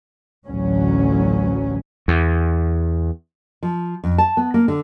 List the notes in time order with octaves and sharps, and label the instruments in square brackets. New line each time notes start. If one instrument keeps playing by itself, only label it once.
[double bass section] A1 D2 F#3 C#4
[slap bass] E2
[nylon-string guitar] F3
F2
A5
B3
A#3
D3